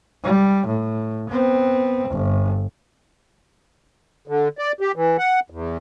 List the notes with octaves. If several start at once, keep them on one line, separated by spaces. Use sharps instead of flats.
G3
A2
B3 C4
G1
D3
D5
G4
E3
F#5
E2